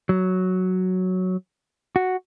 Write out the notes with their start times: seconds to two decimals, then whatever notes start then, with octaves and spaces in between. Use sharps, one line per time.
0.09 F#3
1.96 F#4